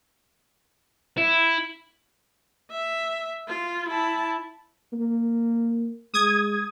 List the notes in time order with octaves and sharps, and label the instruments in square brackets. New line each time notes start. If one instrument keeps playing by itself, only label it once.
[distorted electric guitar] E4
[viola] E5
F4
E4 A5
[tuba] A#3
[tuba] G#3 [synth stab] D#6 G#6